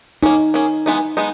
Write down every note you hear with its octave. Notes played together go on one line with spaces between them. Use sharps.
A#3 C#4 D#4 G#4
A#3 C#4 G#4
E3 G#3 B3 D#4
G#3 B3 D#4